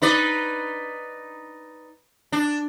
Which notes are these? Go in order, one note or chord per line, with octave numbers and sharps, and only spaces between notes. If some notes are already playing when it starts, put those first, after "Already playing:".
D#4 B4 D5
D4